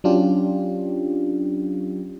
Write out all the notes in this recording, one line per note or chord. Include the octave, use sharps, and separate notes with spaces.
F#3 C#4 D4 F4 G4